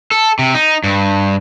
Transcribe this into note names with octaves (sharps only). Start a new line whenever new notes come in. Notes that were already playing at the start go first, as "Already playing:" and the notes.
A4
C3
D#4
G2